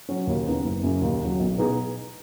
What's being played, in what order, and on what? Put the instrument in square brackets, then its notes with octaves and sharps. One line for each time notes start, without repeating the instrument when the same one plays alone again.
[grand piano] F#3 C#4 F#4
D#2
C#3 B3 D#4
F#1
F#2 C#3
D#2
C#3 F#3
B1
B2 B3 D#4 G#4